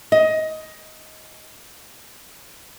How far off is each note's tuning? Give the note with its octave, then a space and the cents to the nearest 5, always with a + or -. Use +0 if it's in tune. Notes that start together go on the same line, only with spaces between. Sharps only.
D#5 +15